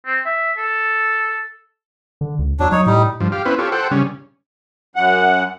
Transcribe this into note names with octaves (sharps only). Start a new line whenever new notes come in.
C4
E5
A4
D3
C#2
E2 F#3 D4
F#3 D#4 C#5
A2 G3 D#4
G2 F3
G4 F5
B3 C#4 E4 B4 C5
F4 G4 A4 C#5
A4 C5 F#5 G5
C#3 G3 C#4
F#2 F#5